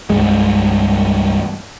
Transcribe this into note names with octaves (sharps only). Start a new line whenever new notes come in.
C2 G2 G#3